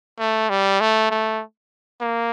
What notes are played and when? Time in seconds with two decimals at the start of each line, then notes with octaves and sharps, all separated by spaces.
0.19 A3
0.50 G3
0.81 A3
1.11 A3
2.02 A#3